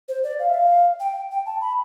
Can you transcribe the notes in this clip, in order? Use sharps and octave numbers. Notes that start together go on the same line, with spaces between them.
C5
D5
F5
E5
F5
G5
G5
A5
B5